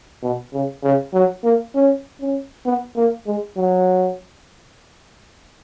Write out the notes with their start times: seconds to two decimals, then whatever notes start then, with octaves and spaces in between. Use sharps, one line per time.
0.23 B2
0.53 C#3
0.84 C#3
1.14 F#3
1.44 A#3
1.75 C#4
2.20 C#4
2.66 B3
2.96 A#3
3.27 G#3
3.57 F#3